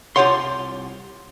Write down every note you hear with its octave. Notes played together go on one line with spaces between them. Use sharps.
C2 F4 G4 C#5 F#5 C6